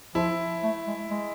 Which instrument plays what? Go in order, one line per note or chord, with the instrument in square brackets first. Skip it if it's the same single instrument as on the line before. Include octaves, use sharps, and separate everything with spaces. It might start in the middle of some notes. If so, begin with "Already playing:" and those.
[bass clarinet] F3 [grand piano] E4
[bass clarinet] A3
G#3
G#3